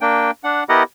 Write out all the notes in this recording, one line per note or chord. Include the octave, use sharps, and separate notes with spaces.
A#3 D4 G5
D4 F#5
B3 E4 G4 A#4 D#5 F#5